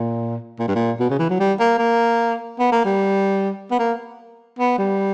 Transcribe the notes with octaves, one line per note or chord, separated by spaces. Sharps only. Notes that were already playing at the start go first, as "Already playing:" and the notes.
Already playing: A#2
A#2
G2
A#2
B2
C#3
E3
F#3
G3
A#3
A#3
B3
A#3
G3
B3
A#3
B3
G3